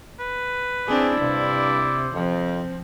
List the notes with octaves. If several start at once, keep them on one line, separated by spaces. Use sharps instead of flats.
B4
C4 D4 E4 G#4 D5
G2 C3 C5
F2 F3 C4